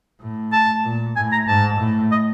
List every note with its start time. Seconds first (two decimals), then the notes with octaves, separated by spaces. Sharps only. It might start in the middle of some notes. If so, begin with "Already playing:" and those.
0.21 A2
0.52 A5
0.84 A#2
1.16 A2 G#5
1.32 A#5
1.48 G#2 A5
1.80 A2
2.12 D#5